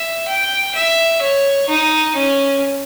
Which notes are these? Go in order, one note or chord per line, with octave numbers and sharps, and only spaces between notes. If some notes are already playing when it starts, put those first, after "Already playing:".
Already playing: E5
G5
E5
C#5
D#4
C#4